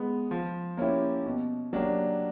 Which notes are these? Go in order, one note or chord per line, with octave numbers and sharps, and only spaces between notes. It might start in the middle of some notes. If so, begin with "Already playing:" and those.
Already playing: G#3 B3
F3
A#3 C#4 E4 G4
B2
F#3 A#3 D4 G4